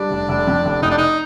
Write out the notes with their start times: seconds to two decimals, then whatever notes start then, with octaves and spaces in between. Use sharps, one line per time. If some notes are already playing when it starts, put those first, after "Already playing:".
Already playing: G3 D4
0.11 F1
0.29 F1
0.47 F2
0.65 F1
0.82 F1 D#4
0.91 D4
0.98 D#4